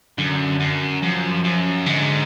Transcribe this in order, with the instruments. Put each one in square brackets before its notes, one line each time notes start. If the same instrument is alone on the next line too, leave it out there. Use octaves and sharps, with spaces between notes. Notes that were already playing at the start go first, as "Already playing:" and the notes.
[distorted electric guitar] F#2 [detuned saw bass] D3
[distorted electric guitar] F#2
[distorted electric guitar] F#2 [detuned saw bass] F3
[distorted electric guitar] F#2
[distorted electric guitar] G#2 [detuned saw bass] D3